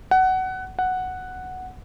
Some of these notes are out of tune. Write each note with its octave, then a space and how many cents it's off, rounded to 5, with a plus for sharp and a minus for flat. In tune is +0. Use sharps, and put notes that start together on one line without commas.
F#5 +20
F#5 +0